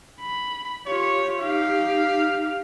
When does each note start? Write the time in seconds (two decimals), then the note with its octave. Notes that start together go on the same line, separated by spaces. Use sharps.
0.20 B5
0.86 F4 G4 C#5
1.40 D#4 G4 F5